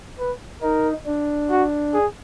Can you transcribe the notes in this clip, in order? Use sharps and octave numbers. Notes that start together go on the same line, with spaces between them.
B4
D#4 A#4
D4
F#4
G#4